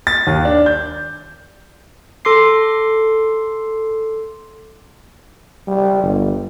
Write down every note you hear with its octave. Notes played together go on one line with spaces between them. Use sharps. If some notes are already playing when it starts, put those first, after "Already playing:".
A6
D#2
D4
G6
A4 C6 D6 C7
G3
G1